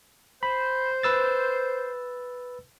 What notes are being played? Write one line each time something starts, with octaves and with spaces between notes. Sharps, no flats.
C5 B5
B4 E6 A6